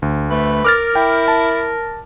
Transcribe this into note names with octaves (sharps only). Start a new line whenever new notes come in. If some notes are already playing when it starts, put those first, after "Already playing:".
D2
A3 B4
A#4 D6 F6 A6
E4 G5
A5